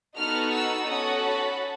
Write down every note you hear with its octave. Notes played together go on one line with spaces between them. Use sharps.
B3 D#4 F#4 A4 F6
E6
C#4 F#4 A4 D#6
B5